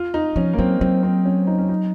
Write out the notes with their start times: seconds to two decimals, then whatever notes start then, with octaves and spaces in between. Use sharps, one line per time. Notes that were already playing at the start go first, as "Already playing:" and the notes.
Already playing: F4
0.14 D#4
0.36 F3 C#4
0.53 A#3
0.59 F#3 C4
0.81 F#3 C4
1.03 C4
1.25 C#4
1.47 D#4
1.58 C#4
1.69 D#4